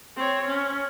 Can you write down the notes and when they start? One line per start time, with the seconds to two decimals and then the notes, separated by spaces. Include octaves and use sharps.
0.16 C4 C#5
0.48 C#4